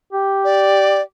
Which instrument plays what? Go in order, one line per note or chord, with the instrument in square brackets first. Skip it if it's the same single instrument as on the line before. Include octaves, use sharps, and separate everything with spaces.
[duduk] G4
[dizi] D5